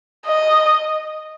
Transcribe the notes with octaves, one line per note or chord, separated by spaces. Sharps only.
D#5